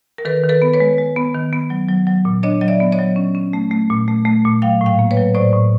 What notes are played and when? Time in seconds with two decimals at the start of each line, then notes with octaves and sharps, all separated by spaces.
0.18 A#4
0.25 D#3 A4 B4
0.44 D#3
0.49 A4 B4
0.62 B3
0.73 B4 C#5
0.80 G#3
0.98 G#3
1.16 B3
1.35 D#3
1.53 B3
1.70 F#3
1.89 F#3
2.07 F#3
2.25 A#2
2.43 D4 C#5 D#5
2.61 F#3 D#5
2.68 D5 E5
2.80 B3
2.92 C#5 D#5
2.99 F#3
3.16 C#4
3.35 C#4
3.53 A3
3.71 A3
3.90 A#2
4.08 A3
4.25 A3
4.45 A#2
4.62 F#3 F5 G5
4.81 A2
4.86 F5 G5
4.99 A#3
5.11 B4 C#5
5.17 F#3
5.35 A2 C5 D5
5.53 A2